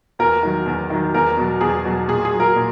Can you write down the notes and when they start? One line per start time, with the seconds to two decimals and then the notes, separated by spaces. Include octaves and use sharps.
0.19 E2 A#4
0.43 D#3 F#3
0.66 E2
0.90 D#3 F#3
1.14 E2 A#4
1.37 B2 F#3
1.61 E2 G#4
1.85 B2 F#3
2.08 A#2 G#4
2.25 G#4
2.33 F#3
2.40 A#4
2.56 A#2